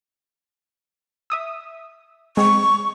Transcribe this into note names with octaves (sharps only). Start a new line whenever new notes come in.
E5 D#6 E6
G#3 C4 C#6